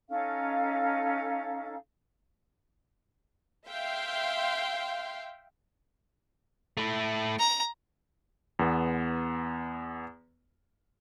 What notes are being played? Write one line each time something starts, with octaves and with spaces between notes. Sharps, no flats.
C#4 D#4 A4 F5
E5 F5 G5 C6
A3 E4
A#5
E2 B3